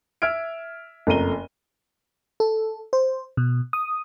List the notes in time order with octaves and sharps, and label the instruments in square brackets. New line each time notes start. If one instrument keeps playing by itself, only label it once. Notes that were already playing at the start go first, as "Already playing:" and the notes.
[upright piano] E5 E6 F6 G#6 D7
F#1 F2 A3 A#5 D#7 G7
[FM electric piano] A4
C5
B2
D#6